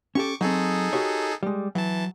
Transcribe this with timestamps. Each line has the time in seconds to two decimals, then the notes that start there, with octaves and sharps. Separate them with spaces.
0.15 C#4 G4 A4 C#6 D6
0.41 F#3 C4 D#4 G#4 A4
0.93 F#4 G4 C#5
1.43 G3 G#3
1.75 E3 F#3 A5